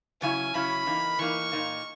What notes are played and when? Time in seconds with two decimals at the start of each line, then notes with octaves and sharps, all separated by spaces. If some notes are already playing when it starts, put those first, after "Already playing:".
0.22 C#3 F#3 C#4 E4 G#5
0.54 C#3 F#3 C#4 E4 B5
0.86 E3 A#3 D#4
1.19 E3 A#3 D#4 C#6
1.52 A#2 A#3 D#4